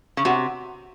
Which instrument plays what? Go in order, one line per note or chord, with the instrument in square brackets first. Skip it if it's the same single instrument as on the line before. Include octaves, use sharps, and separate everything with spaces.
[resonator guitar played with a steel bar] C#3
[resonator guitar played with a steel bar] C3 [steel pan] F#4